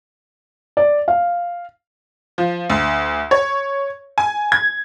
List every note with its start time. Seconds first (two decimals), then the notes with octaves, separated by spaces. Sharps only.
0.77 D5
1.08 F5
2.38 F3
2.70 D2
3.31 C#5
4.18 G#5
4.52 G#6